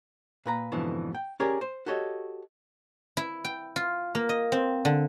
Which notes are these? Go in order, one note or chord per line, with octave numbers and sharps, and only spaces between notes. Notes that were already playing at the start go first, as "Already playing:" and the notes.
A#2 B4 A#5
F2 G#2 B2 D3 E3
G5
C#4 G4 G#4 A#4 D5 G#5
C5
F#4 G4 A4 C#5 D#5
E4
G5
F4
A#3
D#5
C4
D3